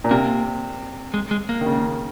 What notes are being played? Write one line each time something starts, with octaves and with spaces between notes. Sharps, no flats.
A#2
C3 A#3
G#3
G#3
A#3
D#3
C#3